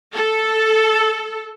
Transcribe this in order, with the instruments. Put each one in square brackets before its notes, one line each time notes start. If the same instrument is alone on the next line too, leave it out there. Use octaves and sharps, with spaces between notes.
[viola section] A4